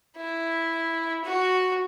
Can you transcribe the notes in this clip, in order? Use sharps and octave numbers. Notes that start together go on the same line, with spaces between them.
E4
F#4